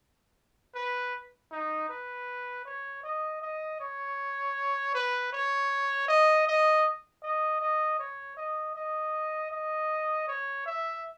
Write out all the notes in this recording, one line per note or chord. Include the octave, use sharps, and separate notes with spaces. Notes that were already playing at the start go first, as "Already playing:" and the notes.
B4
D#4
B4
C#5
D#5
D#5
C#5
B4
C#5
D#5
D#5
D#5
D#5
C#5
D#5
D#5
D#5
C#5
E5